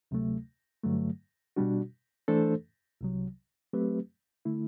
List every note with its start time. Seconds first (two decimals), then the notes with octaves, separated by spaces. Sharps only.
0.11 D2 C3 F#3 A3
0.84 G2 D3 F#3 A3
1.56 B2 G3 D4 F#4
2.28 E3 A3 D4 A4 C5
3.01 C2 C3 F#3
3.73 F#3 A3 C4 G4 B4
4.45 D3 A3 E4